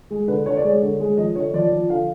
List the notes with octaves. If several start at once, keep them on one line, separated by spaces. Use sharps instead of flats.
G#3
D3 B4
D3 C#5
D5
G#3 C#5
D3
G#3
F3 D#5
D3 C#5
F3 D5
F3
D3 F5